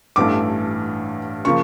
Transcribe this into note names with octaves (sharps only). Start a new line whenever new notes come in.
A1 G2 E3 A3 D6
C#3 F3 A#3 C#6